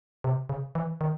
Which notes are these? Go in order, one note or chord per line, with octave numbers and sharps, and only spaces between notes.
C3
C#3
E3
D#3